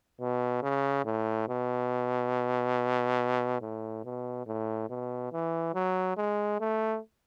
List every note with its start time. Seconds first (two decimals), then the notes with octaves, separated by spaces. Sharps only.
0.20 B2
0.62 C#3
1.05 A2
1.49 B2
3.61 A2
4.04 B2
4.47 A2
4.90 B2
5.32 E3
5.74 F#3
6.17 G#3
6.60 A3